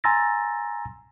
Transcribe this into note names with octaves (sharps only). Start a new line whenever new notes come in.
G#5 A#5 C6 E6 A6 A#6